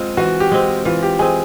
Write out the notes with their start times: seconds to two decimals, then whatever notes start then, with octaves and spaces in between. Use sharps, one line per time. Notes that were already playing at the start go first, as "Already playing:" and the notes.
Already playing: G#3 C4 F4
0.17 E3 F#4
0.40 G4
0.52 G#3 C4
0.85 E3 F4
1.03 G4
1.19 G#3 C4 G#4